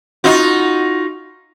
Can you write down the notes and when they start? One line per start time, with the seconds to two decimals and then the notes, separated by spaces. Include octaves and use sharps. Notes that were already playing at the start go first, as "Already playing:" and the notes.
0.24 D#4 F4 F#4